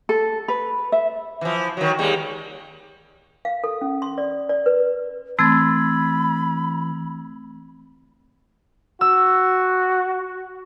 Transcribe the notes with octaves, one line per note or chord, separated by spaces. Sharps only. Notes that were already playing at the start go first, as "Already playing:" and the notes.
A4
B4
E5
E3 F3
D#3 F#3
D#2 G3 G#3
F5
A4
C#4
C6
D5
D5
B4
E3 A3 C4 B5 E6 G#6 A6
F#4 E6